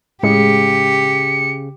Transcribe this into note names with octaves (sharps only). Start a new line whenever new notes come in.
A2 C#3 G#3 G4 G#4 C#7